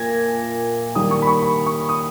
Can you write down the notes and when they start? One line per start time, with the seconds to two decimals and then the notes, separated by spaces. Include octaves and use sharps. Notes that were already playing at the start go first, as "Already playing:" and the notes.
Already playing: A#2 G#6 A#6
0.95 D#3 G3 A#3 D#6
1.11 C#6
1.22 B5
1.27 C#6
1.42 B5
1.67 C#6
1.89 D#6